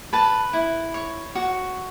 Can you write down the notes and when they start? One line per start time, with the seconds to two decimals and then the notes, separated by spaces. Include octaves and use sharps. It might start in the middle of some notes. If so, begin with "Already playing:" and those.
0.13 B4 A5
0.53 E4
0.94 C#5
1.35 F#4